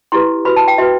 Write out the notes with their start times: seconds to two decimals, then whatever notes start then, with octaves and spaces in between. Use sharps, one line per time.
0.12 E4 G4 B4 C6
0.45 F#4 B4 B5
0.56 A5
0.68 G5
0.78 F#4 B4 E5